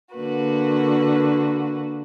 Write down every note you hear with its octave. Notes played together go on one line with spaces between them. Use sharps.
D3 A#3 F#4 B4